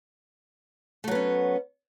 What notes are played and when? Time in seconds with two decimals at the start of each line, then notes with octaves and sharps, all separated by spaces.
1.04 A3
1.08 F#3
1.11 B3
1.15 C#4